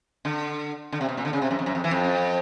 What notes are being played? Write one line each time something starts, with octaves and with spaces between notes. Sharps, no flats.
D3
D3
C3
B2
A#2
D3
C#3
C3
F#2
F2
F#2
F2
E3
F2